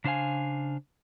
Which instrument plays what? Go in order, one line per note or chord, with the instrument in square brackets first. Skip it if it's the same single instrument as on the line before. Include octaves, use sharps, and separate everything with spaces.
[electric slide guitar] C#3 D4 C5 F5 G#5